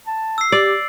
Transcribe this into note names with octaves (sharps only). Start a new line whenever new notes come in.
A5
E6 C7
G4 D5